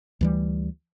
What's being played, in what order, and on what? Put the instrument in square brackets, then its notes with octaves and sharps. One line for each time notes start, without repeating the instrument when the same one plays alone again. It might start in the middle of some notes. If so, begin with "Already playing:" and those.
[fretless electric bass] D2 E3 G3